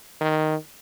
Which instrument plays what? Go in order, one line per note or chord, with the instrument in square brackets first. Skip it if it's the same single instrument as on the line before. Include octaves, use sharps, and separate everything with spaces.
[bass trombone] D#3